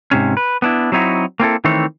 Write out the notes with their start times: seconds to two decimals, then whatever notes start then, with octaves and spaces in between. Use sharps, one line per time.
0.11 G#2 C3 C#4
0.37 B4
0.62 B3 D4 E4
0.92 F#3 C4 D#4 E4 F#4
1.40 A#3 C4 E4 A4
1.64 D#3 E3 A3 C4 C#5